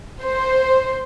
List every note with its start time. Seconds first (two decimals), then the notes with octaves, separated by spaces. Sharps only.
0.23 C5